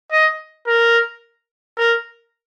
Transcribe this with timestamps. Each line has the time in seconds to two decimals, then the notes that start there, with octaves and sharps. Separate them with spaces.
0.11 D#5
0.67 A#4
1.78 A#4